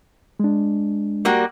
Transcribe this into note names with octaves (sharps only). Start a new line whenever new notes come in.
G#3 D4
G3 A#3 F#4